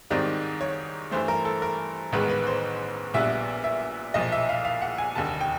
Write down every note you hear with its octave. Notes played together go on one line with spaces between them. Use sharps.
G#2 D#3 G3 C4 D#4 D5
C#5
G2 E3 A3 C5
A#4
A4
A#4
A1 G#2 D#3 G#3 B3 B4
B4
C5
A#1 A#2 G3 B3 D4 E5
E5
B1 A#2 F3 D#5
E5
F5
F5
F#5
G#5
F1 D#2 D3 A5
G5